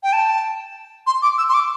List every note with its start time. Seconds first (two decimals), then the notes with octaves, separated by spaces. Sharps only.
0.03 G5
0.13 A5
1.07 C6
1.22 D6
1.38 E6
1.49 C6
1.54 D6